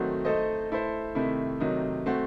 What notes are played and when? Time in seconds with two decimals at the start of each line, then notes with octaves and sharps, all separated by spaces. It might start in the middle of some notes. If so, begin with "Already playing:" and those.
Already playing: D#3 F#3 A3 C4 F#4
0.25 A3 D#4 A4 C5 D#5
0.70 A3 E4 A4 C5
1.15 C3 D#3 A3 E4
1.60 C3 D#3 F#3 A3 D#4
2.06 A3 C4 F#4